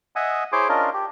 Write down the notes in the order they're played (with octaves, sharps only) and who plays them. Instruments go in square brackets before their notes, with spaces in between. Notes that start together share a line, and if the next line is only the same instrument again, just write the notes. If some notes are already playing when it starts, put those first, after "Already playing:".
[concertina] D#5 E5 F#5 G#5 D#6
E4 G#4 C5 C#5 C6 D6
C#4 D4 F4 A#4 D#5
G4